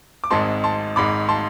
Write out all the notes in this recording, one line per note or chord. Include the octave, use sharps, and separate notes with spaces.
D6
G#1 G#2 G#3 C4 A5 C6
A5 C6
G#1 G#2 G#3 B5 D6
A5 C6